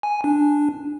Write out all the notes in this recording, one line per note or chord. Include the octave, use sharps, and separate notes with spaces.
G#5
D4